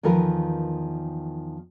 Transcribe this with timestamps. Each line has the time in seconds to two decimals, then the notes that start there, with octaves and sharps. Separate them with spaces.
0.03 E2 D#3 F3 F4 A#4 B4